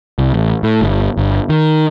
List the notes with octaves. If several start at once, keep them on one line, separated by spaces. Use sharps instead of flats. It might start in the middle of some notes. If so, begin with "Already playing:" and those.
C2
A1
A2
G1
G1
D#3